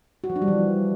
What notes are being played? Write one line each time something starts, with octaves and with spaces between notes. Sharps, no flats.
F#4
F3
D4
G3
E3